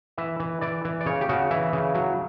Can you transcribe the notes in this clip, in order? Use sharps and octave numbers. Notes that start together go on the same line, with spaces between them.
E3 E5
E3
E3 D5
E3
D5
C#3 C#5
G4
C#3 F#4
E3 E4
C#3
F#3